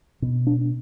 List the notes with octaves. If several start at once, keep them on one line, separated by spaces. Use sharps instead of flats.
B2
D4